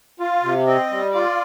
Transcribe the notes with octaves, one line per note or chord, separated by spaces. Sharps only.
F4 F5
C3
C4 D#5
G3
F4 D5